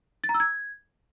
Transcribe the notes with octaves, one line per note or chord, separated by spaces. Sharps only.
A6
A#5
E6
G#6